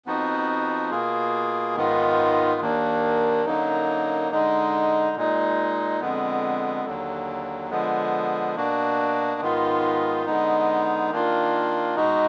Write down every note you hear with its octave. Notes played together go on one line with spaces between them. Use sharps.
F2 F3 B3 D#4 F#4
B2 A#3 F4 G#4
G#2 D#3 G#3 B3 F4
D#2 D#3 A#3 D4
F#2 D3 F#3 A#3 D#4
D3 G#3 D#4
A#2 G#3 D#4
F2 D3 G#3 B3
D#2 D3 F#3
D3 F3 G#3 B3
B2 A#3 D4 F#4
G#2 D#3 G#3 B3 F4
D3 G#3 B3 D#4
D#3 A#3 D4 F4
B2 G#3 D#4 F#4